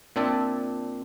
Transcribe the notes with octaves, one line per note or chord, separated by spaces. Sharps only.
A#2 C4 D4 E5 A5